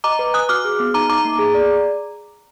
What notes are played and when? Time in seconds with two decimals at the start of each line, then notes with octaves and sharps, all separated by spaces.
0.04 D#5 A#5 D6
0.19 B4
0.34 G#5 D#6 F#6
0.49 F#4 D6 F6
0.65 G#4
0.80 B3
0.94 D#4 A#5 D6
1.09 D#4 A#5 D6
1.25 A#3
1.39 G#4
1.54 D5